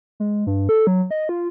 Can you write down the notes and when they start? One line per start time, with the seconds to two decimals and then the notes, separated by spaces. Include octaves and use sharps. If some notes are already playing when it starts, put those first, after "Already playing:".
0.20 G#3
0.47 G2
0.69 A4
0.87 F#3
1.11 D#5
1.29 F4